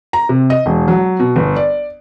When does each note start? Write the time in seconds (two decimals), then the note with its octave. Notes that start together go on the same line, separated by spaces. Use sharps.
0.13 A#5
0.29 C3
0.50 D#5
0.66 E1
0.88 F#3
1.19 B2
1.36 G1
1.56 D5